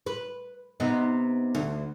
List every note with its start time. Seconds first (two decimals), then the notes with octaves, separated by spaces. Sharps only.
0.06 B4
0.80 C3 B3 D#4
1.55 D2